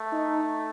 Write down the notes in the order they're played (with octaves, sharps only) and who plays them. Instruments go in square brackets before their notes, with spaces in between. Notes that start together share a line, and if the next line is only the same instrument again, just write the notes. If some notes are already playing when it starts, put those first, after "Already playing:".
Already playing: [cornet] A3
[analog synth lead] D#4